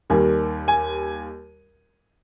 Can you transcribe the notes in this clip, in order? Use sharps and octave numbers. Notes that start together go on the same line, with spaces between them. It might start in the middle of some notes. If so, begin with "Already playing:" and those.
D#2 D#3 G3 G#5
G#5